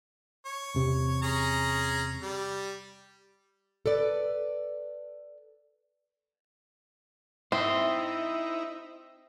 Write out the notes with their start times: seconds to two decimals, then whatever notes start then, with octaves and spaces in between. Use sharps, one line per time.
0.46 C#5
0.75 E2 C3 C4
1.23 C#4 G#4 A#5
2.22 G3
3.86 A4 B4 D5
7.52 C4 D#4 E4 C5 D#5 E5